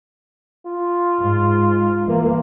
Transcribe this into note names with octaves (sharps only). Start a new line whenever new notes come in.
F4
G#2
E3 A#3